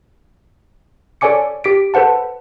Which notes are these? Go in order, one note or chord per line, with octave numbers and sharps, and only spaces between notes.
A4 C#5 D5 G#5 D6 C#7
G4 B6 D7
A4 B4 C5 F#5 A5